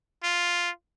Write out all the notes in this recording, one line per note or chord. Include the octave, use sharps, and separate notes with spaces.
F4